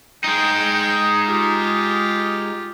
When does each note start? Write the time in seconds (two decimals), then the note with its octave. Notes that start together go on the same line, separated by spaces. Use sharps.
0.24 G#3 D#4 G5
1.26 F4 G4